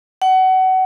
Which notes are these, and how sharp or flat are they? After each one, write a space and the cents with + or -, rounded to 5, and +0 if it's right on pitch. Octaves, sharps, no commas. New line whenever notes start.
F#5 +25